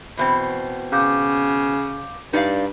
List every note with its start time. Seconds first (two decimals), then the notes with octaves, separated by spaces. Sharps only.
0.17 E2 B2 C4
0.92 C#3 F5 D6 G6
2.33 G2 D#4 D5 F5